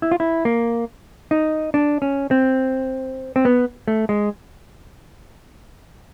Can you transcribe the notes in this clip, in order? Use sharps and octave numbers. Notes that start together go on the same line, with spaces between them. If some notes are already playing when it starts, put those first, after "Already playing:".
E4
F4
E4
A#3
D#4
D4
C#4
C4
C4
B3
A3
G#3